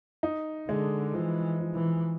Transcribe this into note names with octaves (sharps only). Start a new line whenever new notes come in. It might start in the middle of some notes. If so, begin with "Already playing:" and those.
D#4
D3 G#3
E3 F3
F3
E3